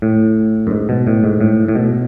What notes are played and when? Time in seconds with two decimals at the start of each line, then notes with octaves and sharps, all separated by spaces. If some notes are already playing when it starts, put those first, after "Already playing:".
0.02 A2
0.67 F#2
0.71 G#2
0.89 B2
1.07 A2
1.24 G#2
1.41 A2
1.68 A2
1.75 B2